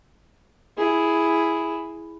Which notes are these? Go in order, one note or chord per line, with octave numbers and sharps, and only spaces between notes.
E4 G#4